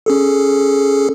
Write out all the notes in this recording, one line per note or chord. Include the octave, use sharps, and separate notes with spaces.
C#4 G#4 A4